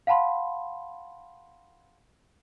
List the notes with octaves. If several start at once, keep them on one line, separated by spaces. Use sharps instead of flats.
F5 F#5 A5 B5 C6